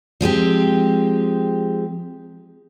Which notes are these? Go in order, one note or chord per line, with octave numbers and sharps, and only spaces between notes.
F3 G#3 C4 G4